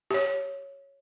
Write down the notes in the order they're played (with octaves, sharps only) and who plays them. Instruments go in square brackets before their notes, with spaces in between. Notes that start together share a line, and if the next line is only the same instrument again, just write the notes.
[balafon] G4 C#5